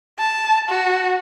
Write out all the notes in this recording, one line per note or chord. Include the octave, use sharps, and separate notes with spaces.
A5
F#4